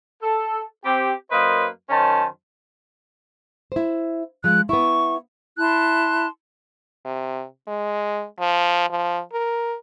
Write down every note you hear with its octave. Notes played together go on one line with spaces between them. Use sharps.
A4
C4 G4
F#2 A#3 B4 C5 D#5
F#2 D#3 C#4 C5 A5
E4 C5
F3 G#3 F#6
B3 E4 C#6
E4 A5 C6 F#6
C3
G#3
F3
F3
A#4